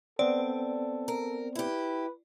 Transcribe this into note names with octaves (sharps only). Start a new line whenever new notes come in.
B3 C4 A4 D5
A#4
E4 G4 B4